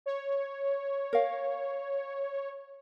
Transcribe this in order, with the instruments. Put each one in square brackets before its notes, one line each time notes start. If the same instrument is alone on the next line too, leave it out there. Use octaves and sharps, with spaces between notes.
[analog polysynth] C#5
[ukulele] A#4 F5